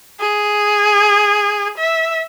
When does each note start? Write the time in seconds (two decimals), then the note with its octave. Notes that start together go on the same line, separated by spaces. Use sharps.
0.20 G#4
1.78 E5